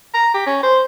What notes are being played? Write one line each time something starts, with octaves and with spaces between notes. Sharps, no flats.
A#5
G4
C#4
C5